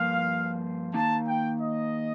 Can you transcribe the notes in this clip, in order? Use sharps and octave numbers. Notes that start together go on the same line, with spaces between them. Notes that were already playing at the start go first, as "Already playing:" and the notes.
Already playing: G2 F3 A#3 F4 F5
D#3 A#3 D#4 A5
G5
D#5